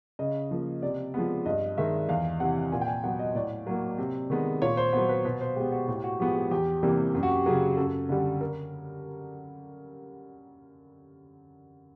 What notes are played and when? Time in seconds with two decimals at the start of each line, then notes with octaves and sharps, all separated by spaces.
0.19 C#3 D#5
0.51 F3 A#3
0.82 C3 D5
1.14 F3 G#3 B3
1.46 G2 D#5
1.77 D#3 G#3 E5
2.09 E2 F5
2.40 C3 E3 F#5
2.72 A#2 G#5
2.81 G5
2.88 G#5
3.04 F#3 B3 F#5
3.19 D#5
3.35 A2 D5
3.67 F#3 A#3
3.98 C3
4.30 D#3 G#3 B3
4.62 A#2 C#5
4.77 C5
4.93 F#3 B3 C5
5.09 B4
5.25 B2 B4
5.41 C5
5.56 G#3 B3 G4
5.72 F#4
5.88 A2 G4
6.04 F#4
6.20 F3 G#3 B3 G4
6.36 G#4
6.51 E2 G4
6.83 C3 E3 G3 A#3
7.14 F#2 G4
7.23 F#4
7.31 G4
7.46 C#3 F#3 G#4
7.77 F#2 A4
8.09 D3 G3
8.41 A#4